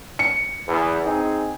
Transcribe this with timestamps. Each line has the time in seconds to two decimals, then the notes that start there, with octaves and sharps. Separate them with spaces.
0.19 C#7
0.67 E2
1.05 C4 D#4 G#4